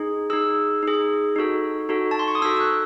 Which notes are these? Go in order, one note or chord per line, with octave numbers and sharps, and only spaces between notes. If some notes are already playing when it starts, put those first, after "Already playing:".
Already playing: D#4 G#4
D#4 G#4 E6
D#4 G#4
D#4 F#4 A4
D#4 F#4 A4
A5
C6
C#6
D#6
D#4 F#4 A4 E6
F#6